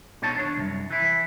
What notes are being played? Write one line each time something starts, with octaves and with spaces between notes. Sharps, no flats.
B2 D#4 C#5 A5
D#2 D4 C#5
C2 F#2
E3 E4